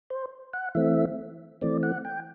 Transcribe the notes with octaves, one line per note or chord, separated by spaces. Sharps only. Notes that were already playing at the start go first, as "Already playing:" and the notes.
C5
F#5
E3 A3 C4 E5
E3 A3 C4 D5
F#5
G5